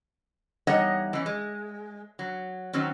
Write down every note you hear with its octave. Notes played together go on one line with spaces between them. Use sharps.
E2 G3 D#4 C#5 D#5 F#5
E3 C#4
G#3
F#3
D#3 F#3 C4 C#4